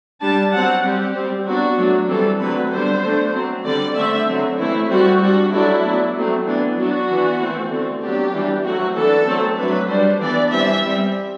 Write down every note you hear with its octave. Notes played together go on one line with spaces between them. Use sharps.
G3 D4 A5
F#3 C4 F#5
G3 C4 G4
G3 C4
F#3 B3 D4 F#4
F#3 A3 D4
E3 G3 C4 A4
D3 F#3 A3 C4 B4
D3 G3 B3 D4 C5
D3 A3 D4
F#3 C4
D3 G3 C4 D5
D3 A3 C4 E5
D3 F#3 C4
E3 A3 C4 E4
G3 C4 F#4
G3 D4 F#4
F#3 A3 D4 E4
F#3 B3 D4
F#3 A3 C4
E3 B3 D4
F#3 B3 D4 F#4
E3 B3 D4
E3 A3 C4
D3 A3 C4
F#3 B3 D4 G4
E3 G3 D4
F#3 A3 C4 F#4
E3 B3 D4 A4
F#3 A3 C4
F#3 A3 D4 B4
G3 D4 C5
E3 B3 D4 D5
E3 G3 C4 E5
G3 C4